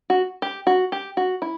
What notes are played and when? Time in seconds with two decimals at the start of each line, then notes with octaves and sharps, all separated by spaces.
0.10 F#4
0.42 G4
0.67 F#4
0.92 G4
1.17 F#4
1.42 E4